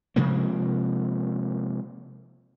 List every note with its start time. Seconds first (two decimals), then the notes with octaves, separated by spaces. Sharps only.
0.16 C3 F3 G#3 A#3